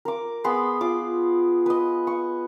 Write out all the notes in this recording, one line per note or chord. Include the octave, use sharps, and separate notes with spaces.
A#4 D6
B3 G#4 B5 C6
F4 D6
B4 D#5
C#6